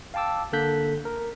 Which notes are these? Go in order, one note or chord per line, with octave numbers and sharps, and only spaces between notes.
F5 G5 A5 D6 E6
D3 A#3 A4 F#6 G6 B6
A#4